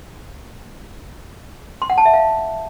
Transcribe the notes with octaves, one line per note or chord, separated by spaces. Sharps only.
C6
F#5
A5
E5
F5